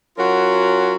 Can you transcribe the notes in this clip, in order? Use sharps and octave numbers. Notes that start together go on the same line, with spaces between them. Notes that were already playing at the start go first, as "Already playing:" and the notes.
F#3 C#4 F4 F#4 A#4